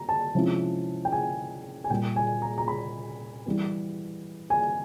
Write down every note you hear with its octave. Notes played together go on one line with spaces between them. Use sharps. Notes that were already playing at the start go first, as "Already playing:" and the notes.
Already playing: A#5
A5
C3 F3 G#3 C#4 E4
G5
G#5
G#5
A#2 G3 A#3 G5
G#5
A#5
A#5
B5
E3 G3 B3
G#5